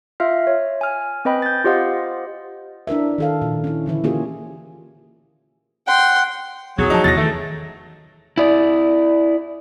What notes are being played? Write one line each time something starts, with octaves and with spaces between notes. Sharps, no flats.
F4 E5 F5 F6
C#5
G#5 F6
C4 B4 D#5 G5 B5
G6 A6
F4 G4 C5 D#5 F5 F#5
D4 E4 A#4 E5
D#3 A4 F5
A#2
C#4 E4
D3 E3 E4
A#3 C#4 F4 G4 G#4
F#5 G5 C6
B1 E2 F#3 G#4
D3 F3 D#4 A5
E2 C3 E3 A6 A#6
D#3 E3 A3
E4 D5